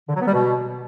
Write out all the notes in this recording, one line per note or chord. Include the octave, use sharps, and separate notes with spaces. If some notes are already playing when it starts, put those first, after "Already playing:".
D3
F#3
B3
G3
B2